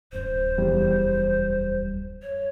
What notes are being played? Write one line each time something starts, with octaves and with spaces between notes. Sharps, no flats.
D1 F#2 C5
E2 G3
C#5